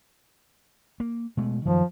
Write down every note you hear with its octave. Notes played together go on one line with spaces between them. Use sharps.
A#3
B2 G#3 A3
F#2 D#3 F3